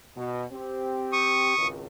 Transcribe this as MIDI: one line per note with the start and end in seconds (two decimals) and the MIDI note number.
0.17 0.45 47
0.52 1.56 60
0.52 1.56 67
1.12 1.67 85
1.12 1.67 87
1.57 1.87 32
1.57 1.87 37